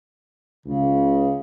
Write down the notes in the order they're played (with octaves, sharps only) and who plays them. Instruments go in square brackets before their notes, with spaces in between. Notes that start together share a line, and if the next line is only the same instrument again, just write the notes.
[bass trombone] C#2 [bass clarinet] C#3